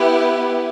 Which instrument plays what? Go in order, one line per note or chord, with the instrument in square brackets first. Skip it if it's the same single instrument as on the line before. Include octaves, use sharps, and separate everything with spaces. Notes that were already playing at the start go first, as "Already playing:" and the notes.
Already playing: [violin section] B3 E4 G4